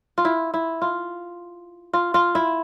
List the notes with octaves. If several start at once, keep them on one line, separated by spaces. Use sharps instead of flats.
F4
E4
E4
F4
F4
F4
E4